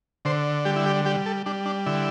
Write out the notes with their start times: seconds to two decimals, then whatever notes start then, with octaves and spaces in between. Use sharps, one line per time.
0.25 D3 C5
0.65 G3 G4
0.76 E4
0.86 G4
1.05 G3 G4
1.26 A4
1.46 G3 D4
1.66 D4
1.86 D3 E4